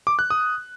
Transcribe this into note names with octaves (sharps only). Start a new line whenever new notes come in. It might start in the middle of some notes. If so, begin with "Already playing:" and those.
D6
F#6
D#6